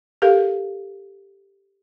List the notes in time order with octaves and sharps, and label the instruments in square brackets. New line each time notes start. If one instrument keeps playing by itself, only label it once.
[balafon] G4 A4 A#4 F5